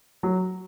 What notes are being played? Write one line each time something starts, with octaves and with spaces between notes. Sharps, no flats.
F#3